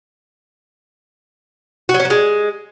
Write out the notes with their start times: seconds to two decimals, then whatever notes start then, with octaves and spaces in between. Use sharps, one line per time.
1.89 F#4
1.94 F#3
2.00 C#4
2.05 F#3
2.10 G#3